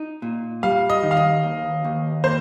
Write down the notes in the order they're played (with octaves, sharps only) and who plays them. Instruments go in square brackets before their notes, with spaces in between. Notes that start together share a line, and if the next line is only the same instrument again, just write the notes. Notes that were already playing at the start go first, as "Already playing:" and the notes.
Already playing: [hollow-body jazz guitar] D#4
A#2
[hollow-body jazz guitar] G3 [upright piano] F5
[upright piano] D#5
[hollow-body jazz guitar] D#3
[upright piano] F5
D#5
[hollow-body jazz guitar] D#2
D#2
[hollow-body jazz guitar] A#3 [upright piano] C5